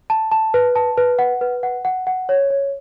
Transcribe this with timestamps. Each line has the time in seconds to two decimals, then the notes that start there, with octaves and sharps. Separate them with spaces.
0.10 A5
0.31 A5
0.54 B4
0.75 A5
0.98 B4
1.19 F#5
1.41 B4
1.63 F#5
1.85 F#5
2.07 F#5
2.29 C#5
2.50 C#5